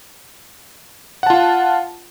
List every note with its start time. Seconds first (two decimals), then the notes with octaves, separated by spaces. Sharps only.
1.23 F#5
1.27 A5
1.30 F4